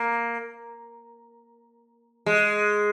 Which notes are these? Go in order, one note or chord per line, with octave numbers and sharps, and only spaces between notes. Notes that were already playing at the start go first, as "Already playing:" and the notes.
Already playing: A#3
G#3